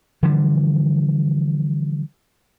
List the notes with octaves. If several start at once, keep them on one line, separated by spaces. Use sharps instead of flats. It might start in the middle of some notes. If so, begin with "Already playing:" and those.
D3 E3 F3 G3